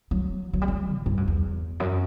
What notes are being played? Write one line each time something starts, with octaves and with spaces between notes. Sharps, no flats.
F#3
F#3
G3
F#3
A2
G2
F#2
E2
F#2